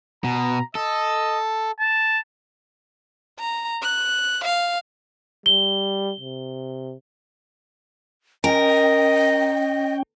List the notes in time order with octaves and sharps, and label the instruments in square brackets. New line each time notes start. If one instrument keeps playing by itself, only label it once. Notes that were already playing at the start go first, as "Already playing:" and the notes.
[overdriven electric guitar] B2 [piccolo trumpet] A#5
[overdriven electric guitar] A4 [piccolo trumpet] D#5
[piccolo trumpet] A5
[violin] A#5
F#6
F5
[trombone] G3 [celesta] G7
[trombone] C3
[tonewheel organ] C#4 G5 [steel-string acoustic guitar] A#4 [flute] D#5